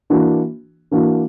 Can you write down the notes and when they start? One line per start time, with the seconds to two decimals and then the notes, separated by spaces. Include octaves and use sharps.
0.10 E3 A#3 D4 F#4
0.91 E3 A#3 D4 F#4